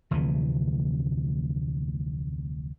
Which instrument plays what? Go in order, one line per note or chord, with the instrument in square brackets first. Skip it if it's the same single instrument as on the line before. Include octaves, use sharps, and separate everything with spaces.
[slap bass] F1 D2 C3 E3